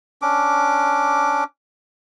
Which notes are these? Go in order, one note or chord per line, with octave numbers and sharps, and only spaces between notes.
C#4 D4 D6